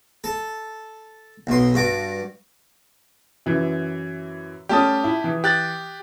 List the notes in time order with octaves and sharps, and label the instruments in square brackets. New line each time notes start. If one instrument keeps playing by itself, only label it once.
[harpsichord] A4
B1 B2 C6
G2 F#4 D6
[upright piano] F#2 E3
[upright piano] G3 A3 C#4 [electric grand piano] G4 A5 D#6
[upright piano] E4
E3
[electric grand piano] G4 F#6 A6